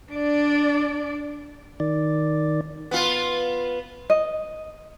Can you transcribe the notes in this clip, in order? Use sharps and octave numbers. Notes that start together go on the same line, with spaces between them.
D4 D5
D#3 D5
B3 F4
D#5